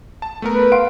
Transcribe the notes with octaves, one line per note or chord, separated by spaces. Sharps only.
A5
A3 B3 A#4
B4
F5 F#5 C6 D7